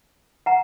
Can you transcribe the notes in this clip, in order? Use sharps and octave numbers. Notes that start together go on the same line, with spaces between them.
F#5 A#5